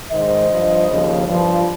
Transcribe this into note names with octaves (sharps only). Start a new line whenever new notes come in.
G#2 D#3 C5 D#5
G2 F3
D#2 C#3 F3
G2 F3